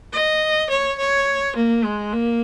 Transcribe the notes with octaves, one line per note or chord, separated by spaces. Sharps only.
D#5
C#5
C#5
A#3
G#3
A#3